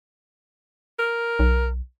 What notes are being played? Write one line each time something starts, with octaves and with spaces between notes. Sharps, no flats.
A#4
B1